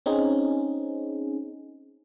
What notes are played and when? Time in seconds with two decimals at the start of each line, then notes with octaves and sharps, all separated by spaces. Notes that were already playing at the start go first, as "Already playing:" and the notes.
0.06 C4 C#4 D#4 G#4